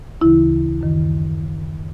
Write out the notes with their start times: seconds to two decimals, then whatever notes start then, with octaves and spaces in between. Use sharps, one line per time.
0.21 D2 C#3 E3 E4
0.81 F#2 D#3